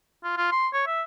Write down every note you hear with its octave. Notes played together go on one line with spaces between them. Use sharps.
F4
F4
C6
C#5
E5